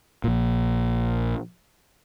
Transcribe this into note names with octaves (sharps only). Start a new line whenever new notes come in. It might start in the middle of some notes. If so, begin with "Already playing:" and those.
A#1 A#2